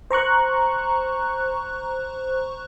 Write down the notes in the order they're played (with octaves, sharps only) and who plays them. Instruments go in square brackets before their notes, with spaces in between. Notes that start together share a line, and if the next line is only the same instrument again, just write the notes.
[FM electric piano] C5 A#5 C#6 F#6